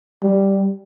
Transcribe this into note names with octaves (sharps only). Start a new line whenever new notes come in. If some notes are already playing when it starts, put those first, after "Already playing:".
G3